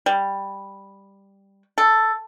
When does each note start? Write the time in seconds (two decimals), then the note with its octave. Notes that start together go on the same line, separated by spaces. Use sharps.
0.06 G3
1.78 A4